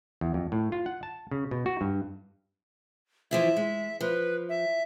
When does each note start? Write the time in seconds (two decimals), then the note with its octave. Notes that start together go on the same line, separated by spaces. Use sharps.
0.21 E2
0.34 F2
0.52 A2
0.72 F4
0.86 F#5
1.03 A5
1.31 C#3
1.51 B2
1.66 F#4
1.81 G2
3.31 E3 F3 E4 E5
3.56 G#3
4.01 F3 B4
4.49 E5